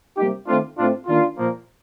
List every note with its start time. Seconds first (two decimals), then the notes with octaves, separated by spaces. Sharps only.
0.17 C3 G3 A#3 D#4 G4
0.47 D#3 A3 C4 D4 F4
0.78 A2 A3 C4 D4 F4
1.07 D#3 A#3 D4 F4
1.38 A#2 F3 A#3